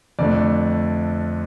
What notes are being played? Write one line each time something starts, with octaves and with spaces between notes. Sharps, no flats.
F2 D3 A3 D5